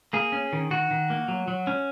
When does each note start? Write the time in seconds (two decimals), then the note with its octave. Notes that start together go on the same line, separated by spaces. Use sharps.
0.13 A#3 G#4
0.32 C#4
0.53 D#3
0.71 D#3 F#4
0.91 D#3
1.10 A#3
1.28 F#3
1.48 F#3
1.67 C#4